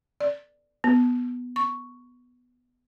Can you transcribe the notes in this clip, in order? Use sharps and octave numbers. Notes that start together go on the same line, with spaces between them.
D5
B3
C#6